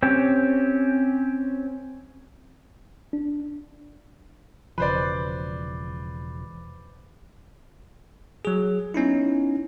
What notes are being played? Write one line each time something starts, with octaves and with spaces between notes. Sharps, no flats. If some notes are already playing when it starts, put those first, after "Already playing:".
C4 C#4 G4
D4
E1 C#3 F3 B4 C5 D5
F#3 G#4
B3 C#4 D#4 E4